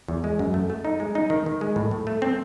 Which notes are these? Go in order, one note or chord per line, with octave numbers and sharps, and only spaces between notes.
E2
G#3
F#2
A3
A3
D#4
G#3
D#4
D#3
D#3
G#3
A2
A2
A3
C4